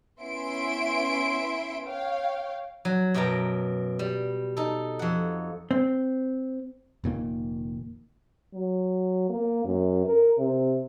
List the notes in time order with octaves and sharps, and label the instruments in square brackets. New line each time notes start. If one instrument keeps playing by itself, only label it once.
[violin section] B3 C#4 E4 E5 C6 D7
C#5 F5 G5
[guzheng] F#3
F#2 B2 G5 A5 A#5
G3
D#4 A4
F2 F#5
[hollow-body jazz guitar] C4
[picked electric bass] F1 A#2 D#3 A#3
[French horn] F#3
A#3
F#2
A#4
C3